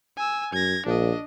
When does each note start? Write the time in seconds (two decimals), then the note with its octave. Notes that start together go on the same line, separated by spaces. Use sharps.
0.17 G#5 E6
0.53 F#2 G#6 A#6
0.86 A#1 D4 D#5